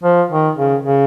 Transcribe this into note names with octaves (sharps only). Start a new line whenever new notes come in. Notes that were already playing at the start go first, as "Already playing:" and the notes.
F3
D#3
C#3
C#3